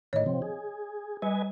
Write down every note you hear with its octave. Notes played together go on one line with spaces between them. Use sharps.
A2 D#3 C#5 D#5
C3 F3 C4
G#4
G3 B4 D#5 G#5